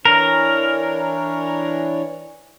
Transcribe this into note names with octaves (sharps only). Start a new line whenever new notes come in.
E3 D4 A#4 C#5